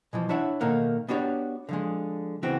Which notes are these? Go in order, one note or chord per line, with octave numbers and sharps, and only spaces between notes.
B2 E3 F3
D4 E4 C#5 E5 F#5
B2 D#3 A3 A#3 F#5
B3 D4 F#4 G4 C#5 D5
D3 F3 G#3
C#2 E3 B3 C4 F#4 G5